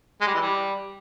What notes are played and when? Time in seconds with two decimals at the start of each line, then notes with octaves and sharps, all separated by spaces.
0.21 G#3
0.27 G3
0.34 E3
0.41 G3